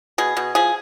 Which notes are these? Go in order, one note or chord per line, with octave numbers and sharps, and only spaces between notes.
B2 G#4
B2
F3 G#4